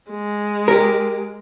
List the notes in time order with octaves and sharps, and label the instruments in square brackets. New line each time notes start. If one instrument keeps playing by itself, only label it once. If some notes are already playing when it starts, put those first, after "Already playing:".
[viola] G#3
[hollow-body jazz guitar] G4 A#4